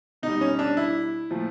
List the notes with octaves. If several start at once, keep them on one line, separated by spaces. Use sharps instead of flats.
B2 G3 D#4
C#4
D4
E4
A#2 F3 A3